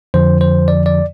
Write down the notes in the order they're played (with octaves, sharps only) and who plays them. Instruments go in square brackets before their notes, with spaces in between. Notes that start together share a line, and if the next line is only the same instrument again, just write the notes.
[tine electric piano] F2 D3 F3 C5
C5
D5
D5